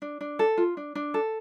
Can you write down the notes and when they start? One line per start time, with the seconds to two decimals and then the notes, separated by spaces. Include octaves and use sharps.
0.02 D4
0.21 D4
0.39 A4
0.58 F4
0.77 D4
0.95 D4
1.14 A4